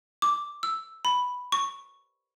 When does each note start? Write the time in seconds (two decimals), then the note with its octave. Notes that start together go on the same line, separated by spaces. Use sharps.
0.22 D6
0.63 E6
1.05 B5
1.52 C#6